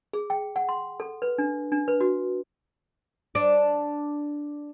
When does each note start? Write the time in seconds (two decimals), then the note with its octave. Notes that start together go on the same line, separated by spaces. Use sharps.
0.13 G#4
0.30 G5
0.56 F#5
0.69 C6
1.00 A4
1.22 B4
1.38 D4
1.72 D4
1.88 B4
2.01 F#4
3.35 D4